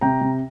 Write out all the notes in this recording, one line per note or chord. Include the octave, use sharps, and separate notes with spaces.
C3 G5 A#5
C3